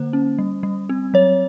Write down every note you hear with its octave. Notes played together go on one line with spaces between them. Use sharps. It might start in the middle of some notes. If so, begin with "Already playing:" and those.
Already playing: D3 A#3 C5
C#4
G3
G3
C4
F#3 C#5